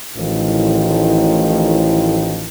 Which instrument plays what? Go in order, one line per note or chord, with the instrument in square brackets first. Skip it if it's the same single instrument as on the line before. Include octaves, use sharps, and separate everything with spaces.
[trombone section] A1 A2 D#3 F3